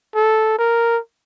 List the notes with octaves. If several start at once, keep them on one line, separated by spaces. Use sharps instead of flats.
A4
A#4